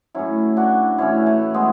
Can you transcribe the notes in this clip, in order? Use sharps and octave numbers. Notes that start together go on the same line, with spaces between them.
A2 F#3 C#4 E4
D4 F#4
A2 E3 C#4 E4
A3
G#3 B3